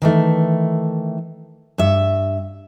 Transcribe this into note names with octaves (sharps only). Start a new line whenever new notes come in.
D#3 E3 A3
G2 E5